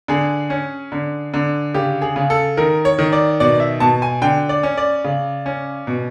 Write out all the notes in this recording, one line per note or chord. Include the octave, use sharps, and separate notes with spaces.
D3 G#4
C#4
D3
D3
C#3 G4
G#4
C#3
A4
D#3 A#4
C#5
D#3
D5
B2 D5
E5
B2 A5
G#5
D3 G5
D5
C#4
D5
C#3
C#4
B2